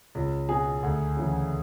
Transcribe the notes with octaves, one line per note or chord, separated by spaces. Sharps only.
C#2
B2 G#4
D2
C#3 E3